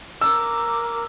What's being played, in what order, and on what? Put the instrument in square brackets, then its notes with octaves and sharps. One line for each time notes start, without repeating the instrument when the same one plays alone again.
[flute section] A#4 A#5 D6 [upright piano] E6